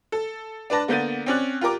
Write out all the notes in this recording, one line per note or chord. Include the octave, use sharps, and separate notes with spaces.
A4
D4 B4 D5 A5 A#6
D3 A#3 B3 G6 A6 D#7
C4 C#4 D5 F#6
F4 G4 A#4 D6